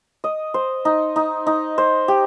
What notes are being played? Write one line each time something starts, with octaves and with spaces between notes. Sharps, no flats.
D#5
C5
D#4
D#4
D#4
C5
G4